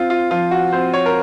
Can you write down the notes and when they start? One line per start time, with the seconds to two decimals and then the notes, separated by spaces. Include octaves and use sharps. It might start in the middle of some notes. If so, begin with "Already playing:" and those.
Already playing: C4 F4
0.10 F4
0.31 F3 F4
0.51 F#4
0.72 C4 C5
0.94 C#5
1.06 A#4